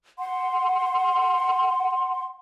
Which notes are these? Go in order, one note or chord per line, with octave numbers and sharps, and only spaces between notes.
F#5 C6